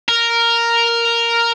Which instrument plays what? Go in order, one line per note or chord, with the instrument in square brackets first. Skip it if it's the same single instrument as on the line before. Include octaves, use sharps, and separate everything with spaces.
[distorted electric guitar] A#4